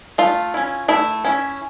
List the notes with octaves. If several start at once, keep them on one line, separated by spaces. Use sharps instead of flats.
A3 F4
C#4 E4
A3 E4
C#4 E4